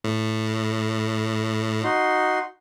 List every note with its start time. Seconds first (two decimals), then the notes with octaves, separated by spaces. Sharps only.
0.04 A2
1.84 D#4 F#4 C6